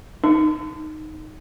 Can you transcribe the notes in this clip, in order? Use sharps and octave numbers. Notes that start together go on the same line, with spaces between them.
D#4